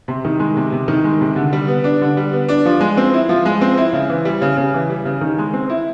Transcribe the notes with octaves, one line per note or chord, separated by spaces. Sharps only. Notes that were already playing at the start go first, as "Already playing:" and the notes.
C3
D#3
G#3
C3
C3
D#3
G#3
C3
D3
G3
B3
D4
D3
G3
B3
D4
F3
G#3
C4
E4
F3
G#3
C4
E4
C#3
E3
G3
C#3
C#3
E3
G3
C#3
D#3
G#3
C4
E4